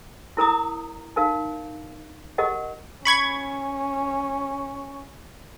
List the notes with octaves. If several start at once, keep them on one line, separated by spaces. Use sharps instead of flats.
E4 A#4 A#5 D#6
D#4 A#4 F5
G4 A#4 D#5 F#5
C#4 B5 C#6 G#6